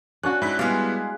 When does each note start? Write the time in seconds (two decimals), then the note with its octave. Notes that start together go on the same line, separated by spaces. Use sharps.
0.23 C#4 D4 F#4 F#6
0.42 G#2 E4 F#6 B6
0.59 G3 G#3 B3 E4 D5 F5